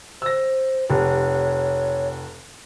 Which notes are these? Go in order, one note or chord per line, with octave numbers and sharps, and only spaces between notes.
C5 E6 A#6
F1 C#5